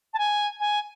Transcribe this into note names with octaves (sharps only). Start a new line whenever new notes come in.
A5
G#5
G#5